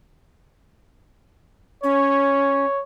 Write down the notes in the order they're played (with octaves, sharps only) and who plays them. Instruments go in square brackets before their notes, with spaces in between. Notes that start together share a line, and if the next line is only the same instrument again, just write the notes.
[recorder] C#4 [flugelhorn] C#5